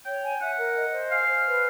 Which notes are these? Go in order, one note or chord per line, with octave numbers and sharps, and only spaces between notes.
C#5 G5
G#5
E5 F#5
A#4
D#5
C5
F5 G#5
C5
B4